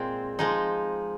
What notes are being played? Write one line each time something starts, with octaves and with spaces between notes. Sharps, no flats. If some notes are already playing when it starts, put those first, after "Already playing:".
Already playing: A#2 G#3 C4
F3 G#3 D#4